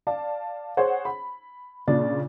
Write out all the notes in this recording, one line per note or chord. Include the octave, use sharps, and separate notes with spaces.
D5 F5 A5
G#4 C5 C#5 F#5
B5
A#2 C#3 D4 A6